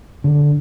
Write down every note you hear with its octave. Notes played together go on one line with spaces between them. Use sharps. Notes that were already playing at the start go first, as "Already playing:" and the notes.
D3